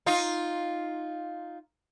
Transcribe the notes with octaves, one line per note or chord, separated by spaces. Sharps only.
D#4 F4